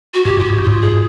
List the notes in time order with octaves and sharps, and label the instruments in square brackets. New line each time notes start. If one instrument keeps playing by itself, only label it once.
[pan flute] F#4
[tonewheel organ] G#2 [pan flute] G4
[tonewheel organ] G2 [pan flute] F4
[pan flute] F#4
[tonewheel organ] G#2
G2
[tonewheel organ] G#2 [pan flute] F4
[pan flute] G#4